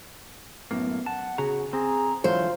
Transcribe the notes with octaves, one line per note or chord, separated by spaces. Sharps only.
F#2 A2 A#3 B3
F#5 A5
C#3 F#4 G#4 A#5
C4 G#4 A#5
D3 E3 F#3 F4 C5 C#5